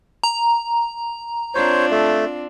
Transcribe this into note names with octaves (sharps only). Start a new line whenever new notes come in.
A#5
C4 D4 F4 C5 C#5
A3